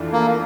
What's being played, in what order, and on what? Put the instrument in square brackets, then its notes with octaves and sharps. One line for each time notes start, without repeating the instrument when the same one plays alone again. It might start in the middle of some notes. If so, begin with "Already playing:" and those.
Already playing: [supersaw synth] F2 E3 A3 D4 F4
[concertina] A#3